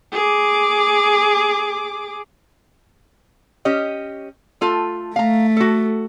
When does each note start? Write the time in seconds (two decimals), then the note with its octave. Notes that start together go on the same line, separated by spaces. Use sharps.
0.12 G#4 D6
3.65 C#4 G4 D#5
4.61 A3 F4 A4
5.16 A3 F5 A#5
5.57 F#4 A4